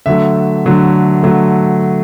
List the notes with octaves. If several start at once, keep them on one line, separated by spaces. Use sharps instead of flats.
D3 F#3 A3 E5
D3 F#3 A3
D3 F#3 A3